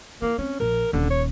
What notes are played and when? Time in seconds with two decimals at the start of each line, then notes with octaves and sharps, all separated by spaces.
0.22 A#3 E4
0.38 C4 C#4
0.60 A#1 A#4
0.93 D#1 D3
1.10 C#5